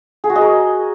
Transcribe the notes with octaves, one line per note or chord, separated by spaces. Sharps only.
G#4
F#4
D#5
A#4